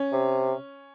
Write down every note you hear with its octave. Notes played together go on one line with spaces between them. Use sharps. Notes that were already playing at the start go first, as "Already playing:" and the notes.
Already playing: C#4
C3